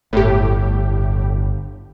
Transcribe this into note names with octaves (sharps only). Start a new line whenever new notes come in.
G1 A2 G4